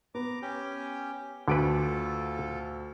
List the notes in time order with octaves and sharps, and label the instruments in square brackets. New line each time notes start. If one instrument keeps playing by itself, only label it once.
[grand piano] B3 [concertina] A#5 D6
[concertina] C#4 G4
[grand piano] D2 D7 [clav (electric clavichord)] D3 B4 [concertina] F4 A4